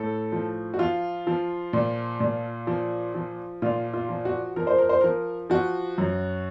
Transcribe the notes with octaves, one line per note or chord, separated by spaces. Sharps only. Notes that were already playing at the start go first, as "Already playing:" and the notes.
Already playing: A2 A4
F3
F#4
F3 F4
F3
A#2
A#2
F3
F3
A#2 F4
F4
F3
F#4
F3 A#4
C5
A#4
C5
F3 A#4
F3 F#4
F#2